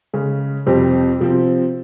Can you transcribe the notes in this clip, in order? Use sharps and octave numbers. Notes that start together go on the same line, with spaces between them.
C#3 G#3 C#4 G#4
F2 C3 G3 C4 G4
C3 F3 C4